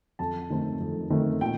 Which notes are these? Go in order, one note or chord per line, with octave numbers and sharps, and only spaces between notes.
F2 A5
D#3 A3 C4
F2
D#3 A3 C4
A#2 G5